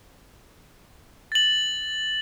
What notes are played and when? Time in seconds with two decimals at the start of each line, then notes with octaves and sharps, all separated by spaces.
1.32 A6 F#7